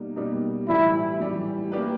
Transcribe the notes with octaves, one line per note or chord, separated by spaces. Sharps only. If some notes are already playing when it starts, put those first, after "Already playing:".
Already playing: B2 G3 A#3 D#4
B2 G3 A#3 D#4
A2 E3 G3 E4
A2 E3 G3
A#3 D4 G4 B4